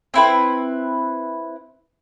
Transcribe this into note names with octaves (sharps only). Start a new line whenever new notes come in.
C4 E4 B4